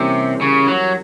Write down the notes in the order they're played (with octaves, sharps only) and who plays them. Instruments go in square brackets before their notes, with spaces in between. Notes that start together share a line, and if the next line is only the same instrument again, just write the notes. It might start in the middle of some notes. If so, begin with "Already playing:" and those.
Already playing: [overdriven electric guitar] C3 [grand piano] E3 G3 A#3 C#4
[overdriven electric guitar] C#3
F#3